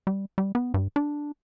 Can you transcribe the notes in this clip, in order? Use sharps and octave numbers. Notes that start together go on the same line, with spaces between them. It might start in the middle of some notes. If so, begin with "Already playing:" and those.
G3
G3
B3
G2
D4